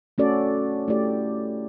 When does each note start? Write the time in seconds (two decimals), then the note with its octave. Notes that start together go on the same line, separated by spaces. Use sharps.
0.18 A3 C#4 F#4 A4 D5
0.88 A3 E4 G4 D5